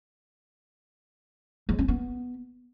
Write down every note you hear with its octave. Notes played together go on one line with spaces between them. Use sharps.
G#3
C#4
B3